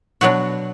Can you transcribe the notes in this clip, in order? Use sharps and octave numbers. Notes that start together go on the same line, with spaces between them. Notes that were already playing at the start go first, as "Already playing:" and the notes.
B2 F#3 B3 D4 F#4